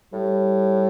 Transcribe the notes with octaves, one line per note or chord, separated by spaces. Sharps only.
A2 G3